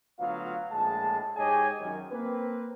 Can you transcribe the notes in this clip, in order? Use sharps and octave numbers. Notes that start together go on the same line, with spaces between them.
D2 F#3 B3 F4 F5
A#1 A2 G#3 A5
G#2 G4 G#4 C#5 D#5 G#5
F#2 D#3
A#3 C4 B4